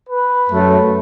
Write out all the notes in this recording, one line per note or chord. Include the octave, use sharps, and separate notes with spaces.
B4
F#2 F#3 A3